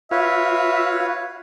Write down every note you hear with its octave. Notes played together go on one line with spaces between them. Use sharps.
F4 F#4 B4 C#5 E5 F5